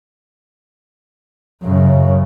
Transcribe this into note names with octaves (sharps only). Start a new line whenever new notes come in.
F#2 C#3